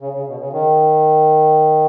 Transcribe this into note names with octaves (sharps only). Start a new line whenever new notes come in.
C#3
C#3
B2
C#3
D#3